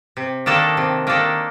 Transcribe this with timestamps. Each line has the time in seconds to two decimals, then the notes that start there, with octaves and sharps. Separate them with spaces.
0.17 C3
0.46 D#3 A#3 D4 A4
0.77 C3
1.07 D#3 A#3 D4 A4